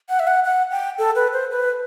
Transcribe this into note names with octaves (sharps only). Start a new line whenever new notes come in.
F#5
E5
F#5
F#5
G5
A4
B4
C5
B4